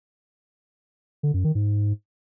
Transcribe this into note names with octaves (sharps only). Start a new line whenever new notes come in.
D3
F#2
D#3
G#2